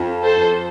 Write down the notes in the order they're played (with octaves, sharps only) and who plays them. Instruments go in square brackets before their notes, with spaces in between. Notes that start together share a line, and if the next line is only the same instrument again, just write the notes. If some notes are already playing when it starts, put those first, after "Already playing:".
Already playing: [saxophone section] F2
[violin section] A4 C5
[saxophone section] F2